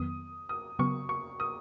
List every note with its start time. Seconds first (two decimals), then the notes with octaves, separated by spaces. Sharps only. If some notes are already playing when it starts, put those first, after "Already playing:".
Already playing: F2 D#3 F#3 B3 D#6
0.49 D#6
0.79 C#3 F#3 B3 C#6
1.09 C#6
1.40 D#6